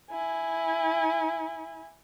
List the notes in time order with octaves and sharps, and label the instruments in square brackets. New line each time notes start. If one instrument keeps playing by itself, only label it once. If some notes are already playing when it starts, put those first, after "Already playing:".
[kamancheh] E4 G#5